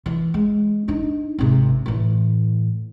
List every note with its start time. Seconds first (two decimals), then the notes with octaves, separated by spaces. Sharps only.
0.06 E3
0.34 G#3
0.88 D4 D#4
1.38 G#1 C3
1.86 A2 E3